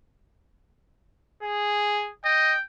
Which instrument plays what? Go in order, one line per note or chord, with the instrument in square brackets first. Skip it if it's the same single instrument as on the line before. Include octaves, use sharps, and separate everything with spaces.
[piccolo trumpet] G#4
[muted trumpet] D#5 [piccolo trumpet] G5